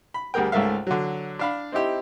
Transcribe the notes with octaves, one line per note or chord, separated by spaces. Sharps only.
B5
D2 G3 G#4 A#4 G5
C#2 G#2 A3 A#4 E5 F5
D3 F#3
D4 F5 B5
C4 D#4 E4 G4